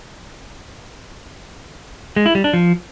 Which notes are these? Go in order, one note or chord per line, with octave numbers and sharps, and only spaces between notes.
G#3
E4
G3
D4
F3